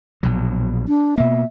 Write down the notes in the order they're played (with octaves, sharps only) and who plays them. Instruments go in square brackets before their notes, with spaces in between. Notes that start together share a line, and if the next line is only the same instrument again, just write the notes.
[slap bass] A#1 B2 F#3
[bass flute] D4
[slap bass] B2 A#3 [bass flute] E5